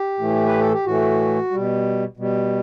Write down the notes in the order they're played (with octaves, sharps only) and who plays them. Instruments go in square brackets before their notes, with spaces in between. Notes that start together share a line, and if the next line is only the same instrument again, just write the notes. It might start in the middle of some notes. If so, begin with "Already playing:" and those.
Already playing: [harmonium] G4
A2 E3 A3
B4
A4
G4
A2 E3 A3 F#4
B2 G3
B2 G3